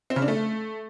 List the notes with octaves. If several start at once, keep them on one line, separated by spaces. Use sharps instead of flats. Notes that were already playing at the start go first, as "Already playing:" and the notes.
C4
C#3
D4
A3